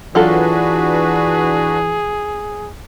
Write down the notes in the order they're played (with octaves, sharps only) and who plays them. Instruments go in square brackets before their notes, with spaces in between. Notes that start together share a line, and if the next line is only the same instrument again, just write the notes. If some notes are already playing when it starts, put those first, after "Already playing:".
[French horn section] E3 [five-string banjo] F#3 F4 A4 [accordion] D4 F#4 B4 [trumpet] G#4